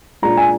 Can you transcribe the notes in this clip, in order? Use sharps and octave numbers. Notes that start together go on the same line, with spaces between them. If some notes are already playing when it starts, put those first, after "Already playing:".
A#2 G#3 D4 F4 A#5
G#5